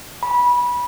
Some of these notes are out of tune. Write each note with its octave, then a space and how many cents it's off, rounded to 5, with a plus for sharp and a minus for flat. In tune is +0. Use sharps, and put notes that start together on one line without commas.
B5 -20